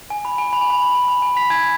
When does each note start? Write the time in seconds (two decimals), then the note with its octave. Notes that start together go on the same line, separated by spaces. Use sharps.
0.10 G#5
0.25 B5
0.38 G#5
0.53 B5
0.61 G#5
0.70 B5
0.83 B5
0.95 G#5
1.08 B5
1.22 G#5
1.36 B5 B6
1.50 G#5 G#6